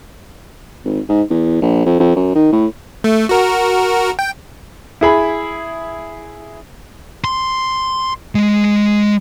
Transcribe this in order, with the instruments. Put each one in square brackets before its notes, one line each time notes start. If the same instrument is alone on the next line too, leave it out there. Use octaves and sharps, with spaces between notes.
[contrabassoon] G#1
G#2
E2
A#1
F2
F2
F#2
D#3
A2
[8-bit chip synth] A3
F#4 A#4
G5
[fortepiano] E4 G#4 B5
[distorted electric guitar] C6
G#3